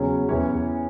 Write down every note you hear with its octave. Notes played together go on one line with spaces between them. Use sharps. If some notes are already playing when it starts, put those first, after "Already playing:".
Already playing: E2 C#3 F#3 C#4
E2 E3 C#4 C#5